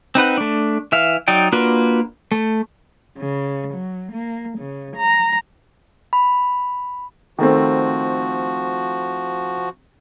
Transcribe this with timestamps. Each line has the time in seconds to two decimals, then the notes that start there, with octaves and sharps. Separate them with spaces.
0.15 C4 D#4 B4 F#5
0.38 A3 D4
0.92 E3 E5 F5
1.28 F#3 D#4 D5 G5
1.52 A#3 D4 F4 F#4 B4
2.32 A3
3.18 C#3
3.74 F#3
4.13 A#3
4.58 C#3
4.98 A#5
6.13 B5
7.39 D#3 F3 A3 C4 F#4